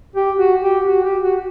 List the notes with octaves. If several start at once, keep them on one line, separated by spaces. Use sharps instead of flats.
G4
F#4
G4
F#4
G4
F#4